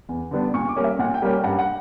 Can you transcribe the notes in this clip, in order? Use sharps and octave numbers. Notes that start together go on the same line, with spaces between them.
E2
D3 G3 B3 D4
A#2 C#6
D6
G3 A#3 C#4
E5
A#2 F#5
G5
G3 A#3 C#4
G2 F#5
F#5